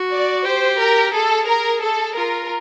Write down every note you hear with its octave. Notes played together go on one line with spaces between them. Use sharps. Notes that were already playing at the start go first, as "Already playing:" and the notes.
Already playing: F#4
D5
G4 C5
A#4
G#4 A4
A#4
A4
F4 A#4